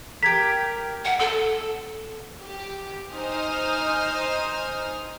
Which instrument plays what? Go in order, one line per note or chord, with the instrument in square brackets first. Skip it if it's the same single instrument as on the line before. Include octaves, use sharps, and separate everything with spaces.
[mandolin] G4 A#4 [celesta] G#6 B6
[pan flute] F#5
[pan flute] A4 [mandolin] A5 E6
[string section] G4
D#4 C5 G#5 D#6 F6